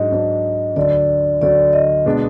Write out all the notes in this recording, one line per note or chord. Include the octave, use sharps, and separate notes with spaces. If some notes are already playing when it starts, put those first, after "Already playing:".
Already playing: G#2 F#3 D4 D#5
G#2 F#3 D4
D2 D3 F#3 D4 D5
D2 D3 F#3 D4 D5
D#5
B2 G#3 B3 D4